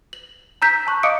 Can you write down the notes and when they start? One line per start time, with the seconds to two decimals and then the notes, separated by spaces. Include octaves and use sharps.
0.13 F#7
0.62 A#5 E6 G6 B6
0.87 A5 C#6 F#6
1.03 D#5 F5 D6 D#6 C#7 D7